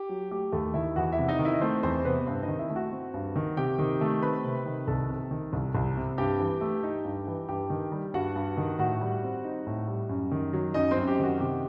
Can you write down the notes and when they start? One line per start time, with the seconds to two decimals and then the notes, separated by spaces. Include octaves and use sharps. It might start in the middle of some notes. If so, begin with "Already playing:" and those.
Already playing: G4
0.09 F#3
0.31 A3 G4
0.52 D#2 A3 A4
0.74 D#3 E4 E5
0.96 E2 F#4 F#5
1.12 E4 E5
1.18 C3
1.28 D#4 D#5
1.39 D#3
1.45 E4 E5
1.54 D#5
1.61 A3 C4 C5
1.83 E2 C4 C5
2.05 C3 B3 B4
2.27 G2 C4 C5
2.43 D#4 D#5
2.48 D#3
2.59 E4 E5
2.70 A3
2.76 F#4 F#5
2.92 C4
3.14 G2
3.36 D#3
3.57 C3 G4 G5
3.79 D#3
4.01 A3
4.22 C4 B4 B5
4.44 C3
4.66 D#3
4.87 C2 A4 A5
5.09 C3
5.31 D#3
5.53 C2
5.75 C2
5.97 C3
6.18 G2 G4 G5
6.40 E3
6.61 A3
6.83 D#4
7.05 G2
7.27 E3
7.49 G2 G4 G5
7.70 D#3
7.92 G3
8.14 G2 F#4 F#5
8.35 G2
8.57 D#3
8.79 A2 F#4 F#5
9.01 G3
9.23 C4
9.44 D#4
9.67 A2
9.88 G3
10.09 F#2
10.31 D#3
10.53 F#3
10.74 F#2 D#4 D#5
10.91 C4 C5
10.97 F#2
11.07 G4
11.19 D#3 F#4
11.40 C3 G4